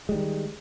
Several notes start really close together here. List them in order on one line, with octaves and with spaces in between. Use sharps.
G#3 G3 D#3